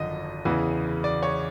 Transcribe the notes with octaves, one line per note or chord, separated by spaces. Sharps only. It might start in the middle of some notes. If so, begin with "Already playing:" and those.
Already playing: G#1 F#2 D3 F3 D#5
E2 C#3 E3
D5
C#5